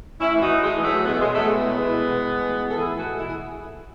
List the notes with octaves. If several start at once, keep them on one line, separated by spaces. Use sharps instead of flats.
A2 C#4 E4
E3
D#4 F#4
E3
A2 G#3
E3
F#3 A3
E3
B2 G#3 B3
A3
B2 G#3
B2 F#3 A3
A2 G#3 B3
E3
E3
B2
B2
B2
A2
E3
E3
A4
A2 E4 G#4
E3
F#4 A4
E3
B2 E4 G#4
E4 G#4